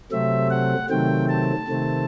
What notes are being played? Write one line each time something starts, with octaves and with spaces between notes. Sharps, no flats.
C3 F#3 A3 C4 E5
F#5
C3 D#3 F#3 A3 C4 G5
A5
C3 D#3 A3 C4